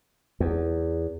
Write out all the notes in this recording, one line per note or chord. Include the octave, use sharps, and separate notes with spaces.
E2